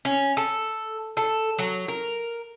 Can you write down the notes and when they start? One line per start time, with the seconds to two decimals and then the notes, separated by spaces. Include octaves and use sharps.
0.05 C#4
0.37 A4
1.17 A4
1.59 F#3
1.88 A#4